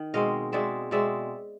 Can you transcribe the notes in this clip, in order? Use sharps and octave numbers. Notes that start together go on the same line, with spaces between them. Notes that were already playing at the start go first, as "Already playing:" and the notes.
Already playing: D#3
B2 G#3 C4 D#5 F5
B2 G#3 C4 D5 E5
B2 G#3 C4 D5 E5